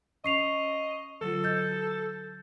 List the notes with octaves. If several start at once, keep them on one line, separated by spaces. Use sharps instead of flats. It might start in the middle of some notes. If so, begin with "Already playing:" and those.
C#4 D#5 C#6 C7 F7
D3 F#3 F4 A4
D#5 G6 A6